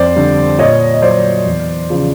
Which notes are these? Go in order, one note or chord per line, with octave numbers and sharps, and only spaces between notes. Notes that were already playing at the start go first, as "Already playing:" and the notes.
Already playing: F2 C5 D5
D3 G3
A#2 C#5 D#5
D#5
F#3 C5 D5
E2
C#3 F3